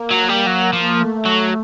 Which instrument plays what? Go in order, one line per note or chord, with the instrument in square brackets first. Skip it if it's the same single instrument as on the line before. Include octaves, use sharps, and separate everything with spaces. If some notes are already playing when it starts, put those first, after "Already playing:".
Already playing: [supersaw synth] A#3
[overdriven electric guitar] F#3
G3
F#3
F3
[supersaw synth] A3
[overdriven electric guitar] F#3